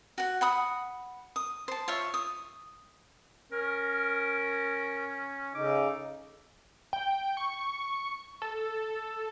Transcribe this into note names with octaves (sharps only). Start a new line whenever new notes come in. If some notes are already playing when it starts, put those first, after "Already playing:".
F#4 F#5
F#5 B5 D#6
D#6
C5 A5
F4 C#5 E5
D#6
C#4 A#4
C#3 D#4 A4 D6
G5
C#6
A4